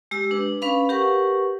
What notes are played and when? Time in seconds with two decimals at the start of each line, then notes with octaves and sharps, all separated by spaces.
0.11 G#3 G4 E6
0.31 D4 B4
0.62 C#4 B4 F5 B5
0.89 G4 A#4 B4 F#5 C#6